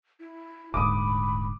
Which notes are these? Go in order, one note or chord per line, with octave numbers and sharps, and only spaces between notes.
E4
D#1 D2 G#2 B5 D6 D#6